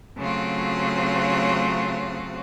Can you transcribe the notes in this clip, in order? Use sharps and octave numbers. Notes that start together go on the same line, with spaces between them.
C#3 F#3 A3 C4 F4 F#4